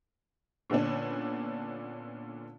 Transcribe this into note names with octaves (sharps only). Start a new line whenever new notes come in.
A#2 D3 B3 C#4 D4